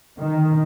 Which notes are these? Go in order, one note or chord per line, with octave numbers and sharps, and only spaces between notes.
D#3